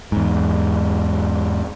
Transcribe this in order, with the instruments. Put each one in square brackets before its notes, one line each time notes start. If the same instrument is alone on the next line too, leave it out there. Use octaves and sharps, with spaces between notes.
[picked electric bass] E2 G#2